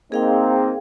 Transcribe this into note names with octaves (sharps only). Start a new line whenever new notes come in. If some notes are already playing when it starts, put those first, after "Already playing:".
A#3 C4 D#4 G#4 F5 G5